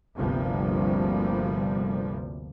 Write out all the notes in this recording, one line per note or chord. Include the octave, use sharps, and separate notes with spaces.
G1 D2 C3 F3 G3 A#3